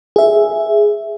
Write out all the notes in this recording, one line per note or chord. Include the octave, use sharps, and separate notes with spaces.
G#4 E5